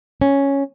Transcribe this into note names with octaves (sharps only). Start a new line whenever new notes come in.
C#4